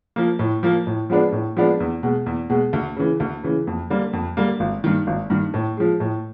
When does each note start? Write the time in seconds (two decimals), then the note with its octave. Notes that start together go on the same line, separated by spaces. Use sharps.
0.16 F3 A#3
0.39 A2
0.63 F3 A#3
0.87 A2
1.10 F3 G#3 B3 D4
1.32 A2
1.57 F3 G#3 B3 D4
1.80 E2
2.03 B2 G#3
2.26 E2
2.50 B2 G#3
2.73 D2
2.96 C#3 E3
3.20 D2
3.43 C#3 E3
3.67 F2
3.90 D3 G3 A#3
4.13 F2
4.37 D3 G3 A#3
4.60 G#1
4.84 G2 D#3
5.07 G#1
5.30 G2 D#3
5.54 A2
5.77 F3 G#3
6.00 A2